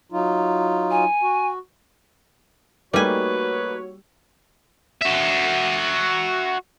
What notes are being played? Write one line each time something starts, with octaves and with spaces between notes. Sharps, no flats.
F#3 D#4 F4
G#5
F#4
G3 A3 A#3 D#4 F#4 B4 C#5 G#5
F#4 E5